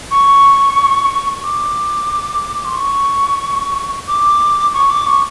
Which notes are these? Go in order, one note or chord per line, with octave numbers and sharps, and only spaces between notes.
C#6
D6
C6
C#6
D6
C#6
D6
C#6